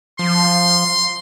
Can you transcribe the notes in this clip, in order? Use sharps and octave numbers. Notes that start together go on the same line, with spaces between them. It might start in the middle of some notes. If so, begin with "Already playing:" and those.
F3 C6